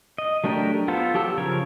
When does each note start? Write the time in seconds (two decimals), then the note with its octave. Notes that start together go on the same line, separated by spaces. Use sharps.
0.18 D#5
0.44 F#3 A3 D4 G4 A#4
0.88 B3 F4 A4 C5
1.14 F#3 G4 A5 E6
1.37 C#3 F3 A#4 C#5